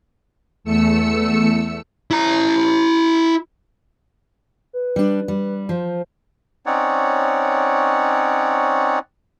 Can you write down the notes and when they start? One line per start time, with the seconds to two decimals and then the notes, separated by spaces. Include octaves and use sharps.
0.64 E2 A3 E6 C#7
2.11 E4 A#5
4.73 B4
4.96 G3 D4
5.28 G3
5.69 F3 C5
6.66 C4 C#4 D#4 C#5 D5 F#5